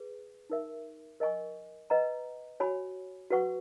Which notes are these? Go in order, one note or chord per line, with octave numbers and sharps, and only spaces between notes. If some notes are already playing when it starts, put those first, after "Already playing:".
Already playing: G#4 B4
D#4 A#4 E5
A#4 D#5 G#5 C#6
B4 D#5 F#5 A#5
F#4 C#5 G#5 B5
F#4 B4 F#5 C#6